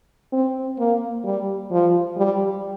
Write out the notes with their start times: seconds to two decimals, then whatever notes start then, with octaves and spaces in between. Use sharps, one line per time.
0.33 C4
0.79 A#3
1.25 G3
1.71 F3
2.17 G3